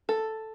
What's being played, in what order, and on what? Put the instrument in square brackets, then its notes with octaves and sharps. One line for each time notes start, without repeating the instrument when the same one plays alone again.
[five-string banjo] A4